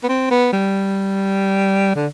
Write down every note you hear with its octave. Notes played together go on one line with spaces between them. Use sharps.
B3
C4
B3
G3
D3